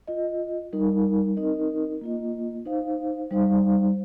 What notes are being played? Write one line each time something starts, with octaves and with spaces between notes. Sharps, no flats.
F4 D#5
G3 D#4 A#4
C4 D#4 A#4 D#5
A#3 F4 D#5
D#4 C5 F5
G3 D#4 C5 F5